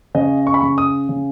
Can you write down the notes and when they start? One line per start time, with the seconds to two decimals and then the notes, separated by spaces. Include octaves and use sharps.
0.15 C#3 D#5
0.47 C#6
0.54 B5
0.61 C#3 C#6
0.78 D#6
1.09 C#3